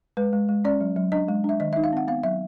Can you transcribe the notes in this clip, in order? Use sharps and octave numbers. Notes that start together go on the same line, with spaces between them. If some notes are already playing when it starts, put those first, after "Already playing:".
G#3 B4
G#3
G#3
C#4 D5
F#3
F#3
D4 D#5
G#3
D4 E5
D#3 D#5
D#4 E5
F5
C4 F#5
B3 F5
F#3 E5